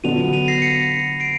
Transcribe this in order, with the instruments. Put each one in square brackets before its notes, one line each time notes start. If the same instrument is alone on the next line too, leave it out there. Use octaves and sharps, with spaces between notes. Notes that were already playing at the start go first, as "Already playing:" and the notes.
[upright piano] D3 F#3 B3 D4 F4 [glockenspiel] D#7 F7
[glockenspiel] D#7 F7
A#6 C7
B6 C#7
C7 D7